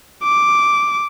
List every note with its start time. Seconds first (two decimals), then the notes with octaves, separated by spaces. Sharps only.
0.23 D6